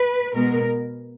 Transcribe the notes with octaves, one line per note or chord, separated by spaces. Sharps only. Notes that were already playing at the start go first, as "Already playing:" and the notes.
Already playing: B4
B2 G#3 B3 A#4